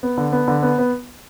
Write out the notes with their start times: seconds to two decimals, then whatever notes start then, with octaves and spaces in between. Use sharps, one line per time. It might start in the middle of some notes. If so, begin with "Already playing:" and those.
0.03 B3
0.18 D3
0.32 B3
0.48 D3
0.63 B3
0.78 B3